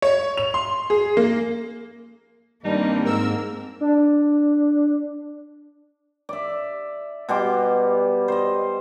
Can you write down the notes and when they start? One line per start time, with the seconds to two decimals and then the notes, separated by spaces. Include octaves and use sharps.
0.02 C#5
0.37 F7
0.54 C6
0.90 G#4
1.17 A#3
2.65 G2 D#3 G3 A#3 C4 D4 D#4
3.05 G#2 A#4 E6
3.81 D4
6.29 D5 E5
7.29 B2 G3 C6 D6
8.28 C5 D#5